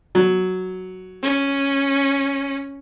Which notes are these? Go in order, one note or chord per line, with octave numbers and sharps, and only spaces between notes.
F#3
C#4